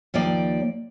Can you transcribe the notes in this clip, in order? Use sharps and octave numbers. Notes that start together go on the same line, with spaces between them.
D#2 F3 A#3 D5 G5